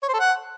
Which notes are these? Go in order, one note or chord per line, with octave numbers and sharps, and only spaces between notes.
C#5
C5
A4
F#5